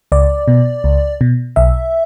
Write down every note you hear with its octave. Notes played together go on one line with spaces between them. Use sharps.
C#2 D5
B2
C#2
B2
B1 E5